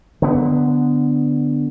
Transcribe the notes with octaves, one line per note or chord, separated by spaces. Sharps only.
D3 B3